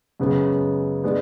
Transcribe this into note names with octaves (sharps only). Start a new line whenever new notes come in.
F#2 C#3 G#3 B3
G#3 B3 D4